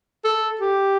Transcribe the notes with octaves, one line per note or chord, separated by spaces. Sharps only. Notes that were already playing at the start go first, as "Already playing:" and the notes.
A4
G4